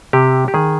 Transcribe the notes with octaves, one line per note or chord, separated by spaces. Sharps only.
C3 G4
G4
D#3 G#4